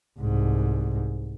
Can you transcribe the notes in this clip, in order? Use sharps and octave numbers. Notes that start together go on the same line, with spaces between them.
C2 G#2